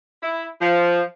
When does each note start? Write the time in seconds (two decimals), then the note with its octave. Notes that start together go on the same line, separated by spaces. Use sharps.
0.22 E4
0.62 F3